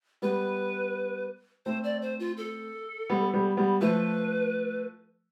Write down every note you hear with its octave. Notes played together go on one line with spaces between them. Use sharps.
G3 B3 B4
A3 C4 C5
D5
C5
F4
A4
G3 B3
G3 B3
G3 B3
F3 A3 B4